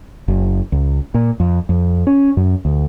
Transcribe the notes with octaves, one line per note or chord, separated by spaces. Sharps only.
F#1
C#2
A#2
F2
F2
C#4
F#2
D2